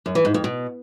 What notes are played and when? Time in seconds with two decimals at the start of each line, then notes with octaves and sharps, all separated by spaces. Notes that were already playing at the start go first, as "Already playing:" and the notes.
0.06 F#2
0.15 E3
0.25 G#2
0.34 F2
0.44 B2